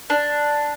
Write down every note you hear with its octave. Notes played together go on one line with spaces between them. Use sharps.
D4